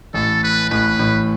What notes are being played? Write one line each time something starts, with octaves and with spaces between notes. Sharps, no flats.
A1 A2 A4
B4
A1 A2 B4
A1 A2